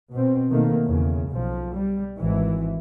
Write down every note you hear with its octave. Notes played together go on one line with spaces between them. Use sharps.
B2 C4
B2 D#3 A3 A#3
E2 C#3
B1 F3
G3
G#1 E3